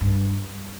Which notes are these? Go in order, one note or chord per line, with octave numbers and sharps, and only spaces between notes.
G2